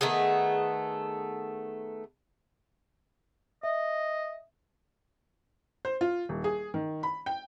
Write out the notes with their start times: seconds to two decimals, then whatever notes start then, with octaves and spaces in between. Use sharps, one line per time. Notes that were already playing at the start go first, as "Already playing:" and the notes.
0.01 D#3 A3 B3 G#4
3.63 D#5 E5
5.85 C5
6.01 F4
6.29 D#1
6.44 G#4
6.74 D#3
7.03 B5
7.26 G5